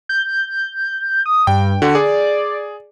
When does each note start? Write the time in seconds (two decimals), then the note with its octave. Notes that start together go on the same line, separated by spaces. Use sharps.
0.09 G6
1.26 D#6
1.47 G2 G5
1.82 D3 F#4
1.95 G#4 D5